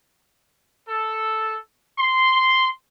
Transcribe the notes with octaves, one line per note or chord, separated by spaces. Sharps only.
A4
C6